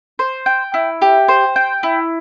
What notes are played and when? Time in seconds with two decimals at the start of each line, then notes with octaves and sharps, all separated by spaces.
0.19 C5
0.46 G5
0.74 E4
1.02 G4
1.29 C5
1.56 G5
1.83 E4